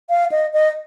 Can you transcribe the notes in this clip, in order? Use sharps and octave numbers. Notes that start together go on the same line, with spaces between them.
F5
D#5
D#5